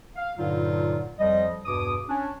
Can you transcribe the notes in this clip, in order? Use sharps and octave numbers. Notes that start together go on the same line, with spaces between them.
F5
G2 A#2 D3 F#3 D#4 F4
F2 F3 G3 D#5
E2 G2 B2 D6 D#6
C#4 D4